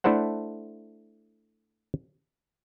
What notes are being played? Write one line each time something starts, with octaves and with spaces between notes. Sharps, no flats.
A3 D4 E4 A4 C5 F#5